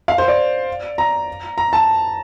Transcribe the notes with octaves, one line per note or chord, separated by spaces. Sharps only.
F5
C5
D5
A#5
A#5
A5